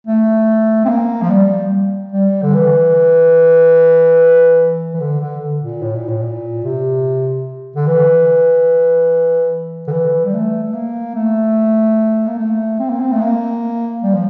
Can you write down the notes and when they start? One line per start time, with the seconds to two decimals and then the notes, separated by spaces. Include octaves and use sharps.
0.07 A3
0.85 C4
0.89 A#3
1.22 F3
1.30 G3
2.12 G3
2.43 D3
2.54 E3
4.94 E3
5.00 D3
5.20 D3
5.62 A#2
5.82 A2
5.95 A#2
6.08 A2
6.22 A#2
6.64 C3
7.76 D3
7.87 E3
9.88 D3
9.92 E3
10.25 G3
10.33 A3
10.64 A3
10.74 A#3
11.15 A3
12.27 A#3
12.39 A3
12.79 C4
12.90 A#3
13.00 C4
13.12 A3
13.21 A#3
14.03 G3
14.14 F3